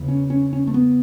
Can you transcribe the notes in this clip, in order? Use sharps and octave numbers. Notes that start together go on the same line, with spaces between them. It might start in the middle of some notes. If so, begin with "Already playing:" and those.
Already playing: E2 C#3
C#4
C#4
C#4
A3
B3